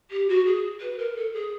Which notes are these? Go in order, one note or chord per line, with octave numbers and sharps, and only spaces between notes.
G4
F#4
G#4
B4
A#4
A4
G#4